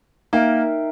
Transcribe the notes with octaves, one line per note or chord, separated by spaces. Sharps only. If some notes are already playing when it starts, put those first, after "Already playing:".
A#3 D#4 A#4 E5 G5